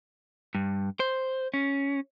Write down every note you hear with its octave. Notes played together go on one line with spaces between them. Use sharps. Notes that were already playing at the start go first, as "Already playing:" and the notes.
G2
C5
C#4